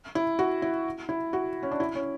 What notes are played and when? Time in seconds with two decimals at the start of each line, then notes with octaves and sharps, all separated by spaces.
0.15 E4
0.39 F#4
0.62 E4
1.09 E4
1.33 F#4
1.63 C#4
1.71 D4
1.80 E4
1.95 C#4